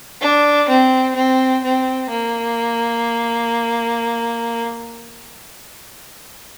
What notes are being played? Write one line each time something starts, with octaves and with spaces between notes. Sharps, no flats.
D4
C4
C4
C4
A#3